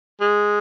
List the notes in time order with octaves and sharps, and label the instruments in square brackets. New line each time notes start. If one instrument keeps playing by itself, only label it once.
[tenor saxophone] G#3